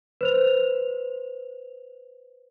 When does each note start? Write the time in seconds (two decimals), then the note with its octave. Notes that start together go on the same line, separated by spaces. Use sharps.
0.21 B4 C5 F7